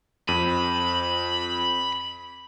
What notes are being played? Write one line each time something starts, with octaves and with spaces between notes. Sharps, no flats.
F2 B5 D#7